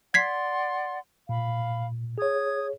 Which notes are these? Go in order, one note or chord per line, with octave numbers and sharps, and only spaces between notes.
D5 F#5 C6 G#6 B6 C7
A#2 F5 B5
G#4 C#5 D#6 G#6